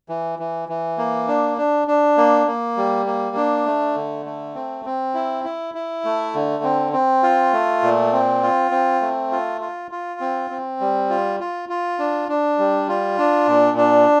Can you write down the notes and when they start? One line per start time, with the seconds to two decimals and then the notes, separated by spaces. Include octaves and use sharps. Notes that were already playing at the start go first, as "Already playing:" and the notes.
0.09 E3
0.39 E3
0.69 E3
0.98 A#3
1.28 D4
1.57 D4
1.88 D4
2.17 A#3
2.47 A#3
2.77 G3
3.06 A#3
3.36 D4
3.66 A3
3.95 D3
4.26 A3
4.55 C4
4.85 C4
5.14 E4
5.44 E4
5.75 E4
6.05 A3
6.34 D3
6.64 C4
6.93 C4
7.23 F4
7.53 A3
7.83 A#2
8.13 C4
8.43 F4
8.71 C4
9.02 A3
9.32 F4
9.61 F4
9.91 F4
10.20 C4
10.51 C4
10.80 G3
11.10 F4
11.40 F4
11.69 F4
11.99 D4
12.29 D4
12.58 G3
12.89 F4
13.18 D4
13.48 A#2
13.77 D4